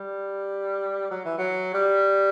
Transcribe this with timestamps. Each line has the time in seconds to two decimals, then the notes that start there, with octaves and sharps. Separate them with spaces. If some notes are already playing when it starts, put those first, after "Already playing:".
Already playing: G3
1.11 F#3
1.25 E3
1.38 F#3
1.74 G3